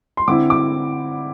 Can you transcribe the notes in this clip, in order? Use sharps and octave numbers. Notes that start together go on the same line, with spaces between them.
C6
D3 C4 E4 D6
D6